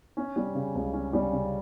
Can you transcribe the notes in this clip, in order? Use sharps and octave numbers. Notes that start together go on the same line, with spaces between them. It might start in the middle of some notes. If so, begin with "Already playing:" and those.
C#4
G3
C#3
C#2
C#4
G3
C#3